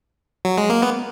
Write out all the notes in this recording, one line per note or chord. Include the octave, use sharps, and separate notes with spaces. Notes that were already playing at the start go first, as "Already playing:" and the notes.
F#3
G#3
A#3
B3